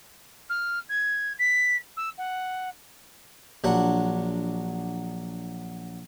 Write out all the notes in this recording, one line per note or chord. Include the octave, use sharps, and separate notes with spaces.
F6
G#6
B6
E6
F#5
A#1 F#3 D4 F#5